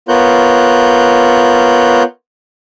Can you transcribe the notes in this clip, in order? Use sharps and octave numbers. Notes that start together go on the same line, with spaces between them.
B3 F4 A#4 C#5 F#6 G6